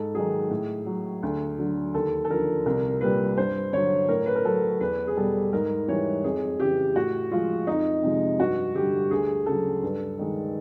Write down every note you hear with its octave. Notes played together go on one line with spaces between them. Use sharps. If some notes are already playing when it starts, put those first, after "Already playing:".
Already playing: G#2 A4
D#3 F#3 G#4
A2
F#3
D2
D3 F#3
D#2 A4
A4
D3 F3 A#4
C2 A#4
A#2 G3 B4
G2 C5
D3 F#3 C#5
A2 A#4
B4
A#4
F#3 A4
E2 B4
G#4
B2 G3 A4
G#2 A#4
E3 G3 C#5
F2 G#4
C#3 E3 G4
A2 F#4
F3 G#3 F4
F2 D#4
C3 F3 G#3
G2 F#4
D3 G3 G4
D2 G#4
C#3 F#3 A4
G2
D#3 G#3